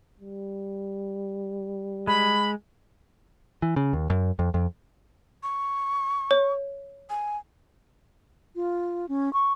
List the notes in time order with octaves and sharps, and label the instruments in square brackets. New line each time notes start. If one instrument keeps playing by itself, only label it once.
[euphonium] G3
[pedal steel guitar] G#3 [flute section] B5
[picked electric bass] E3
C#3
D#2
F#2
F2
F2
[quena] C#6
[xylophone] C#5
[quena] G#5
[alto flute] F4
C#4
C#6